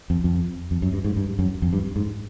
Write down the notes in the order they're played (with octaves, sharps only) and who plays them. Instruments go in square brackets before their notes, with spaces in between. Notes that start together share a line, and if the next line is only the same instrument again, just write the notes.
[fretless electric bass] F2
F2
F2
F#2
G2
G#2
G2
F#2
F2
G2
G#2